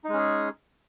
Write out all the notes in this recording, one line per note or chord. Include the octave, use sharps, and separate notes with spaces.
G#3 C#4 D#4 G#4